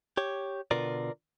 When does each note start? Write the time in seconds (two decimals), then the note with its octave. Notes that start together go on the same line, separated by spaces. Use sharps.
0.17 G4 C#5
0.71 B2 D3 F4 A#4 B4 D5